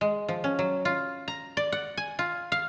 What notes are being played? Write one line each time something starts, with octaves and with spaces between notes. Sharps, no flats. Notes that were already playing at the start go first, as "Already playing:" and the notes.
G#3
F3
C#4
F#3
F4
A#5
D5
F#5
G#5
F4
F5